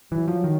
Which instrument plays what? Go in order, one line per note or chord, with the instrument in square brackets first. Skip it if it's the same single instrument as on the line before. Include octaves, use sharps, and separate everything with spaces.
[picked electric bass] E3 [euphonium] F#3
[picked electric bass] F3
D#3